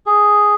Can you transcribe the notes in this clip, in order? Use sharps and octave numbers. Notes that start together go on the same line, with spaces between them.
G#4